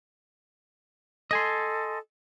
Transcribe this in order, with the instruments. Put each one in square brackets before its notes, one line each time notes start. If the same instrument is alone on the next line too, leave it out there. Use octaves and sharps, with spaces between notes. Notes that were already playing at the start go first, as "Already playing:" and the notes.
[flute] A4 [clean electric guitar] D#5 G#5 C6